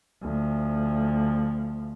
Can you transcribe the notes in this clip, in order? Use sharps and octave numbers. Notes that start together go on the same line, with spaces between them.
D2 F3